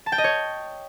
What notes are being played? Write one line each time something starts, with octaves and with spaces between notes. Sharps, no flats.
A5
G5
D#5
C#5